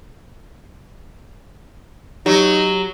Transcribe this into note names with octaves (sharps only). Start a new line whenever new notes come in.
F#3 D#4 G4